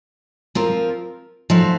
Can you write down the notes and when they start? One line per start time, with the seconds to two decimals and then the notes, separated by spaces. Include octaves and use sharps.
0.55 F3 C4 F4 A#4
1.50 F3 A3 D#4 F#4 C5